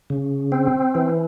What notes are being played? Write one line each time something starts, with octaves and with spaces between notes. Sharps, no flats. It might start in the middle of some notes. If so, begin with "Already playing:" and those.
C#3
C4
E3